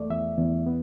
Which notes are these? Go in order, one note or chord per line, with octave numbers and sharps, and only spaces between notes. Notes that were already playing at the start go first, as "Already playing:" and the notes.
Already playing: E2 A3 D5
E2 E5
E2
B3